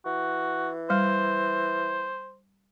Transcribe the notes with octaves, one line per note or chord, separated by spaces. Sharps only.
E3 F#4
G3 C5